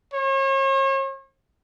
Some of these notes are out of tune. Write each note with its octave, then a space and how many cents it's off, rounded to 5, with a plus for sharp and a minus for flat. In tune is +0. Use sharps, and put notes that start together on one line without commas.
C#5 -40